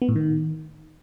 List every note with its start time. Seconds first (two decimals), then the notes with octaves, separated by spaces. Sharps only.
0.02 B3
0.09 A2
0.16 D#3